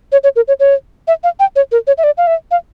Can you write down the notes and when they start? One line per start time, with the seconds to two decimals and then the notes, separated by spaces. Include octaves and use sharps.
0.12 C#5
0.23 C#5
0.36 A#4
0.48 C#5
0.60 C#5
1.07 E5
1.23 F5
1.39 G5
1.56 C#5
1.72 A#4
1.87 C#5
1.98 E5
2.03 D5
2.17 F5
2.27 E5
2.51 F5